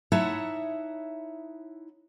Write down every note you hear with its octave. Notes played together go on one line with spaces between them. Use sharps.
D#4 E4 C#5 E5 F#5 A5